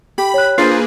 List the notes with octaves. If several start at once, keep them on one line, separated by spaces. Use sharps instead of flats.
G4 B5
C#5 F#6
A#3 D4 F4 G#4 B4 C5 A6 C7